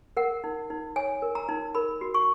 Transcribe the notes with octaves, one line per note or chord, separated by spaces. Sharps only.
A#4 F#5
D#4
D#4
C#5 G#5
A#4
A#5
D#4
A#4 B5
F#4
C#6